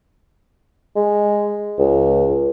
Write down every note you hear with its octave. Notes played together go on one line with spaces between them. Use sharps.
G#3
C#2